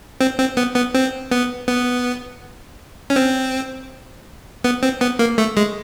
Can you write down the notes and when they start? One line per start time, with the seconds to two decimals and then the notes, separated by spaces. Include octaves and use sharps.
0.21 C4
0.39 C4
0.57 B3
0.76 B3
0.95 C4
1.31 B3
1.68 B3
3.10 C#4
3.16 C4
4.64 B3
4.83 C4
5.01 B3
5.19 A#3
5.38 A3
5.57 G#3